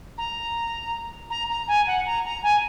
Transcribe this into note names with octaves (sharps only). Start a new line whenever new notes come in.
A#5
A#5
A#5
G#5
F#5
A#5
A#5
G#5